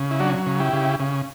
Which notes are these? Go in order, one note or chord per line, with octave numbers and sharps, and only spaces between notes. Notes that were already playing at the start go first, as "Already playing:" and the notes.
Already playing: C#3
E4
F#3 D4 F#4
C#3
E4 G4
C#3
C#3